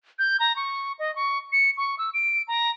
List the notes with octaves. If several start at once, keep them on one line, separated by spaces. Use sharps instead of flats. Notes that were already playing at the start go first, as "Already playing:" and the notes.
G6
A#5
C#6
D#5
C#6
C#7
C#6
E6
D7
A#5